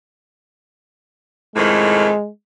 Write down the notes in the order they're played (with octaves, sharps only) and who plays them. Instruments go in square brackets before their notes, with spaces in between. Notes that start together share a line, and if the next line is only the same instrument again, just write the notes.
[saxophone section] F2 A2 D#3 [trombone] G#3